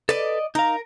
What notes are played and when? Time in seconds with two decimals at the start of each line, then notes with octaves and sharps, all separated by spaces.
0.09 A4 B4 D5 D#5
0.55 D#4 A#4 F5